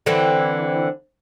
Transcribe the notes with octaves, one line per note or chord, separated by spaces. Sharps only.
D3 E3 C4